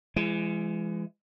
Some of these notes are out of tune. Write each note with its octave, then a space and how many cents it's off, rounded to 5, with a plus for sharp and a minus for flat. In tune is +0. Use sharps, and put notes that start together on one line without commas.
E3 +40 G#3 -5